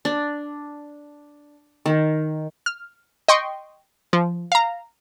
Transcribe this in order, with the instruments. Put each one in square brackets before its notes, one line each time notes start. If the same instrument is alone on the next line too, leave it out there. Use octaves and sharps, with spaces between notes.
[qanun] D4
D#3
[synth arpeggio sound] F6
D#5 G5 C6 C#6
F3
F5 A#5